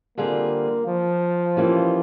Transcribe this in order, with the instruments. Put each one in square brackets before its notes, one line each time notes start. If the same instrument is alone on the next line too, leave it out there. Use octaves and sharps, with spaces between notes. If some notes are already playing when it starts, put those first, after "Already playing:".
[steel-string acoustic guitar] D3 G3 C4 F4 G#4 [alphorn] A#3
[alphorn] F3
[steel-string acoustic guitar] E3 G3 A#3 C#4 F4